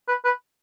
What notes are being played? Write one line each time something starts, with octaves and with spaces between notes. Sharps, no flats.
B4
B4